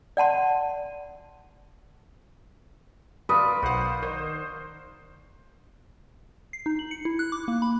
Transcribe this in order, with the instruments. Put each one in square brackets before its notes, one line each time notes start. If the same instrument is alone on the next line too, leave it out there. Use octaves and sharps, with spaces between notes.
[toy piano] D5 F#5 A5 C6
[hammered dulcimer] F4 A#4 D5 [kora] B4 [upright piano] D#6
[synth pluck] B1 F#5 [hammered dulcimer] F#4 C5
[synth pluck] D#3 [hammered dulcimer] C5
[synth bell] C7
D#4
F#7
C#7
E4
F#6
D6
A#3
B5